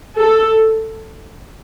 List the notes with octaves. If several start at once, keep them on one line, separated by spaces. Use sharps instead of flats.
A4